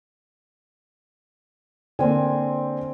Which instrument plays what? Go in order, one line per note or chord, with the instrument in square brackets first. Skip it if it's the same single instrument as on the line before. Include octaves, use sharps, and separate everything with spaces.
[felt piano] D3 A#3 [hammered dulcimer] C4 G#5